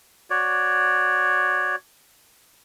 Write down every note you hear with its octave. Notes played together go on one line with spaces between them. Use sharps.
F#4 C#5 D5